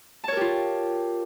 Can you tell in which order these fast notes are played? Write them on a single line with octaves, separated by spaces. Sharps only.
A5 C#5 A#4 G4 F4